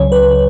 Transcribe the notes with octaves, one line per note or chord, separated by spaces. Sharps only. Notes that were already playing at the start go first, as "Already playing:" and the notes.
Already playing: C#2 C#3 F#3 C#5
B4